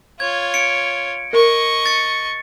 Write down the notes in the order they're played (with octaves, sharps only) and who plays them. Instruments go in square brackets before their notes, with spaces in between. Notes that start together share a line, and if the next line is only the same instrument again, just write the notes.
[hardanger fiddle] F4 C#5 [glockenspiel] G#6
[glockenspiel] C#7 D7
[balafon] A#4 [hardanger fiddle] D#5 C#6
[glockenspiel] A6 C#7